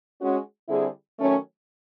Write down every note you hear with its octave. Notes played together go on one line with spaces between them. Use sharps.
G#3 C#4 F#4
D3 G3 C4 E4 G#4
D#3 F#3 A3 C#4